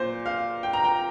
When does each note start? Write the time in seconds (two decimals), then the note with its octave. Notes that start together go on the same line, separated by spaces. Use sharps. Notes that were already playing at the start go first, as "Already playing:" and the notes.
Already playing: A#2 C5
0.26 F5
0.63 G5
0.73 A#5
0.84 G5